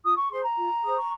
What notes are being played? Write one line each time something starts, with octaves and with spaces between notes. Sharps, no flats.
F4 D#6
C#6
G#4 C5 C6
A#5
F4
G#4 C5 D#6
C#6